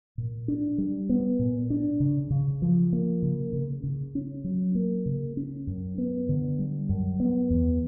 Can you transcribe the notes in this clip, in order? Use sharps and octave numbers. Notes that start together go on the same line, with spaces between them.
A#2
D4
G3
B3
A#2
D4
C#3
C#3
F3
A#3
C#3
C#3
C#3
C#4
F#3
A#3
C#3
C#4
F#2
B3
D3
G3
F#2
B3
E2